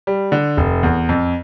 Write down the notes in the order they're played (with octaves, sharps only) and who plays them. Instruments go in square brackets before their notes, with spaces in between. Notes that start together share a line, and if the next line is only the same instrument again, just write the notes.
[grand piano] G3
D3
F1
E2
F2